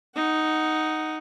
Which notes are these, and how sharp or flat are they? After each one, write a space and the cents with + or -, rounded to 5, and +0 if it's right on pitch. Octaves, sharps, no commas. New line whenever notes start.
D#4 +0 F#5 +5